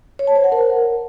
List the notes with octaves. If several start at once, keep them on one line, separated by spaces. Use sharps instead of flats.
C#5
A5
C5
F#5
A#4